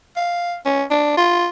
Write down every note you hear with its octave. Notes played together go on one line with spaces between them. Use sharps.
F5
C#4
D4
F4